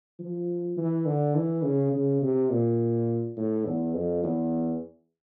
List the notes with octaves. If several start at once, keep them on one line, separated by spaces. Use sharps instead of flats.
F3
E3
D3
E3
C#3
C#3
C3
A#2
A2
E2
F2
E2